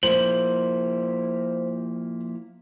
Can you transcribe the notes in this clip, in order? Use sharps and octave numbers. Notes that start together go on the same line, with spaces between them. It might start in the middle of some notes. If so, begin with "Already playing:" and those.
F3 A#3 E4 C5 F#7